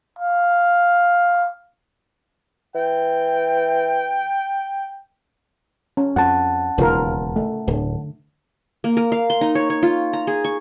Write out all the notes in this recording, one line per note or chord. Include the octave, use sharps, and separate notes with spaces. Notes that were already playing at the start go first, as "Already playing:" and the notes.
F5
E3 G5
C#4
F2 F#5 A5
E1 D#2 C#3 F4 A#4
A3
D1 D3
A#3
A#4
F5
C6
D#4
C#5
C#5
F4
A#5
G#4
C#6